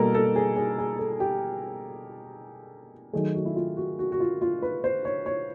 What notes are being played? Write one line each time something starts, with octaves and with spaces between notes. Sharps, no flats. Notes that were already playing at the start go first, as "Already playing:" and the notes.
Already playing: B2 G3 A#3 A4 A#4
A4
G#4
G#4
G#4
A4
G4
D#3 F#3 A3 G#4
F#4
E4
F4
F#4
F#4
F#4
F4
F4
B4
C5
C#5
C#5